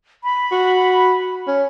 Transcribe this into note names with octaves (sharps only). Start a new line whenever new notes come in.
B5
F#4
C#4